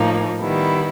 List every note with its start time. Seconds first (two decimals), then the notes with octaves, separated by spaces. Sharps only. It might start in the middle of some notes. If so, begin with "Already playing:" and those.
Already playing: A2 F3 A#3 D#4
0.40 D#3 G3 B3 E4